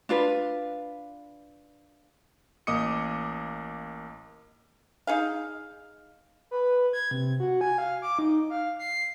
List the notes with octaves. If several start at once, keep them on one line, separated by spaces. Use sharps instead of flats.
D4 F4 B4
A1 A#3 D#5 D6 D#6 C#7
D#4 G#4 F5
B4
G#6
C3
F#4
G#5
F5
D6
D#4
F5
C7